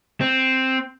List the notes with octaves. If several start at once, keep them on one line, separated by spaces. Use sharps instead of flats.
C4